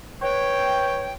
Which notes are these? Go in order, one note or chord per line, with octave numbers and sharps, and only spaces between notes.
B4 C#5 G5